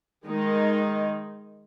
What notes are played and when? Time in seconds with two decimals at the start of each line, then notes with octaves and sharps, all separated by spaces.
0.25 D#3 G#3 D#4